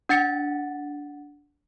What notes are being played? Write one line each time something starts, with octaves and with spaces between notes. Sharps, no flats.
D4 F#5 A6 C#7